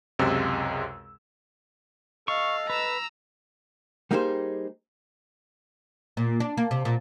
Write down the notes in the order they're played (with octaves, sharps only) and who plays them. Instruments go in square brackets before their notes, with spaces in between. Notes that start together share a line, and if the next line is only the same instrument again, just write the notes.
[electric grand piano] C#2 F#2 C3 G#3 E6
[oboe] A4 [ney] D#5 [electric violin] F5 [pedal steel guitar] C#6
[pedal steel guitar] B4 [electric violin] A#5 E6
[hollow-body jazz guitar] G3 A#3 D#4 G4 G#4 C5
[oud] A#2
D4
A#3
C3
A#2